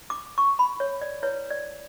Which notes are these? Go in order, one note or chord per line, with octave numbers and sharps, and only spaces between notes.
D6
C#6
B5
C#5
D5
E4 B4 C#5
D5